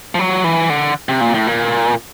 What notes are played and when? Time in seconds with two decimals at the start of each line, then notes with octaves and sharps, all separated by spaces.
0.15 F3
0.19 F#3
0.44 E3
0.70 D3
1.09 C3
1.21 A#2
1.34 A2
1.47 A#2